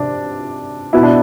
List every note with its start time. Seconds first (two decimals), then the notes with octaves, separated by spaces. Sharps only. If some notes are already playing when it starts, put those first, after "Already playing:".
Already playing: C3 D4
0.93 B2 B3 E4
1.03 D4